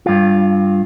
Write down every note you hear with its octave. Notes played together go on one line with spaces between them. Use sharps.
G2 F4